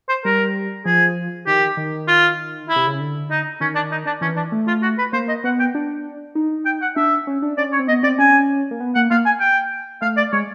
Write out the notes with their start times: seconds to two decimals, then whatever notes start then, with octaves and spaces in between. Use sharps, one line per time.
0.09 C5
0.25 G3 A#4
0.85 F3 G#4
1.47 D#3 G4
1.77 D#3
2.08 F4
2.69 E4
2.76 C3
2.87 C#3
3.00 D3
3.30 D#4
3.61 D#3 C#4
3.75 D4
3.91 D#4
4.06 D4
4.21 E3 C#4
4.36 D4
4.52 A3
4.67 F4
4.82 F#4
4.98 B4
5.13 A#3 C5
5.28 D#5
5.44 B3 F#5
5.59 G5
5.75 D4
6.35 D#4
6.65 G5
6.82 F#5
6.96 D4 E5
7.27 C#4
7.42 D4
7.57 C#4 D5
7.72 C#5
7.79 C4
7.88 B3 D#5
8.03 C4 D5
8.19 C#4 G#5
8.71 A#3
8.80 B3
8.95 A#3 F#5
9.11 A#3 F5
9.26 G#5
9.40 G5
10.02 A3 F5
10.17 D5
10.32 G#3 C#5